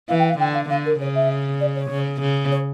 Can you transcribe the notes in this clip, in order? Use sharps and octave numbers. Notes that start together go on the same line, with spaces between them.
E3 F5
G5
F5
D3 G5
F5
D3 F5
A#4
C#3 C#5
E5
D5
C#5
C#3
C#3
C#5